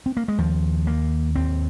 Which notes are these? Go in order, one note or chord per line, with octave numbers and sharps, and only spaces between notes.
C4
A#3
G#3
D#2 F3
A#3
D#2 C4